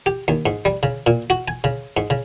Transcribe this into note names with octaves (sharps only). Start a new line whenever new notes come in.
G4
D#2
G#2
G3
C#3
A#2
F#4
G#5
C#3
G#2
C#3